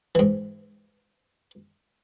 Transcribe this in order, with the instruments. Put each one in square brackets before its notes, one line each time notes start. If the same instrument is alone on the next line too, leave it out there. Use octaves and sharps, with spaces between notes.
[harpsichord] G#2 E3